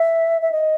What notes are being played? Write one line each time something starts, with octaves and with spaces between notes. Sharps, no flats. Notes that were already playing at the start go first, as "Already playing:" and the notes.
Already playing: E5
E5
D#5